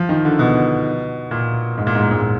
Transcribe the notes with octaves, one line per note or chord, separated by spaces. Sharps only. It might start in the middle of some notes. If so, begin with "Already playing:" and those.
Already playing: F3
D#3
D3
B2
A#2
G#2
A#2
G#2
A#2
G#2
A#2